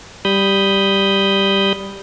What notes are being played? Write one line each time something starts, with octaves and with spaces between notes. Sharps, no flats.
G3 B5 D#6 G6